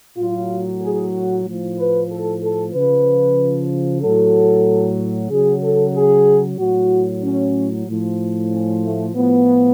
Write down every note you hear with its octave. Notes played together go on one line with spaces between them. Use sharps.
A2 F#3 F4
G#4
F#4
A2 F3
B4
A4
A4
C#3 F3 B4
A2 F#3 A4
C#3 F#3 G#4
A4
G#4
A2 F#3 F#4
C#4
A2 F3
C#4
A3
A2 F3 B3